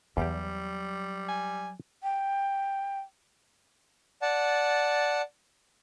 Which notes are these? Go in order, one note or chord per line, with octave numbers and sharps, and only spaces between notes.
E2 F#3 G3 G4
G#5
G5
D5 F#5 A5